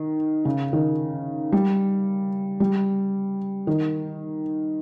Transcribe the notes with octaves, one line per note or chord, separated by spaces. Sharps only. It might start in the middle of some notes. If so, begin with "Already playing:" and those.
Already playing: D#3
C#3
D#3
G3
G3
D#3